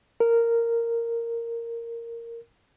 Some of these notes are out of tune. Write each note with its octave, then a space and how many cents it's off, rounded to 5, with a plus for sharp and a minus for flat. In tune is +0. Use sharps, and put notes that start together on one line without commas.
A#4 -10